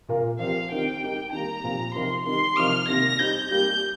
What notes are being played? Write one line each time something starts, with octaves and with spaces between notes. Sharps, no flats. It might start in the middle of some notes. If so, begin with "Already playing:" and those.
A#2 A#3 F4 A#4
F3 C4 G4 A#4 F5
D#3 C4 D#4 G4 A#4 G5
G3 D#4 G4 A#4
D#3 G3 A#3 A#5
A#2 F3 C4 G4
C3 F3 D#4 G4 A#4 C6
D#3 G3 D#4 A#4 C6
C3 F3 D#4 A#4 F6
C3 D#3 A#3 A#6
G3 C4 D#4 G6
G3 A#3 G4 G6